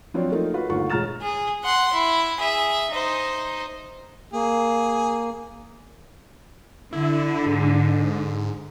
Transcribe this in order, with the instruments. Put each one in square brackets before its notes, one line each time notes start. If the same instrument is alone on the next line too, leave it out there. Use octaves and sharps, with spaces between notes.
[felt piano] F3 F#3 C4 D4 F4 C#5
F3 A3 A#3 D#4 F4
F4 F#4 B4
G1 D#2 A3 F4 F#5 C#6
E1 G#3 A#5 F6 A6 E7
[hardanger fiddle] G#4
F#5 C6
E4
G#4 E5
D#4 C5
[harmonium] A#3 [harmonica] G#4
[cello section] D3 [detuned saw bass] E4
[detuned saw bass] G#2